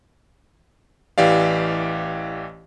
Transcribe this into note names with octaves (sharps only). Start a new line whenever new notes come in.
A1 E3 G4 D5 F5